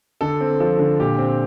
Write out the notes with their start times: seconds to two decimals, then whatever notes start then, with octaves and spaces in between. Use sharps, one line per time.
0.21 D3 A4
0.40 C4
0.60 F3 A4
0.79 D3
1.00 A#2 G4
1.18 C4